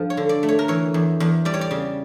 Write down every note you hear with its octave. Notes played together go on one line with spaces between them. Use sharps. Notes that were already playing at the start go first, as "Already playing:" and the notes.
Already playing: G2 F3 A4
C#5
D3
D5
A3
C#5
A#4
E3 C#5
E2
E2
G3 D5
C#5
D5
C#3